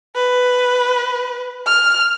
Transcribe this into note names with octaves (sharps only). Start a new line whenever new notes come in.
B4
F6